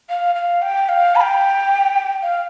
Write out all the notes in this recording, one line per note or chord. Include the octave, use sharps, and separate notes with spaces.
F5
F5
G5
F5
B5
G5
F5